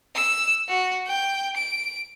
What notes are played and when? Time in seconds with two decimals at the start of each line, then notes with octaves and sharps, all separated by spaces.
0.15 E6
0.69 F#4
1.07 G5
1.56 D7